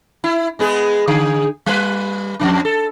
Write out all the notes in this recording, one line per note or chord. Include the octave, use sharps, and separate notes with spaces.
E4
G#3 B3 G#4
D3 G#4
G3 B4
F2 D3 D4
A4